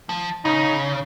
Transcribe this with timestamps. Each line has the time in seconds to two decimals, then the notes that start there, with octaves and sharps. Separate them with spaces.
0.09 F3
0.44 C#3 D#4